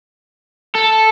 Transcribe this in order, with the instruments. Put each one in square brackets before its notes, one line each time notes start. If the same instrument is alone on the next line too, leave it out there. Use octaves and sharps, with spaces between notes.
[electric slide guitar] A4